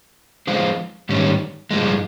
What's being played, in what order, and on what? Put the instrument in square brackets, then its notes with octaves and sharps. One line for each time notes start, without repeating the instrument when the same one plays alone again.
[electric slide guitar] F3 G#3 C4 F4 C5
G#2 D#3 G3 C#4
G2 F3 G#3